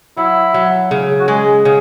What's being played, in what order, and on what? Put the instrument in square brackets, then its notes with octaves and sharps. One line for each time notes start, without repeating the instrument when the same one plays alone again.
[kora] F#3 [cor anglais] E4
[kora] F#3
C#3
[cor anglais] F#4
[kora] G#3 [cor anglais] G#4
[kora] C#3 [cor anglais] G#4